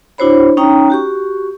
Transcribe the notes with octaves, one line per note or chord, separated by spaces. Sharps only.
D4 E4 F#4 C5 C#5 B5
C#4 D#4 C#5 G5 A#5 D#6
F#4 G4 C#6